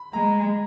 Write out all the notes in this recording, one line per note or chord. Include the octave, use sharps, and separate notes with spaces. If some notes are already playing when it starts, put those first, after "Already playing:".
Already playing: B5
G#3 A#5